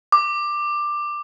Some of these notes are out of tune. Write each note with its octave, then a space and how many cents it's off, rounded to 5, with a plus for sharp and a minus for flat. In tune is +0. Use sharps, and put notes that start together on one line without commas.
D6 +10